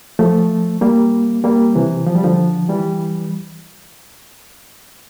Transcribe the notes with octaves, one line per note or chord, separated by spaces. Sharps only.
F3 A3
G3 A#3
G3 A#3
C3 E3
F3
G3
D3 F3
E3 G3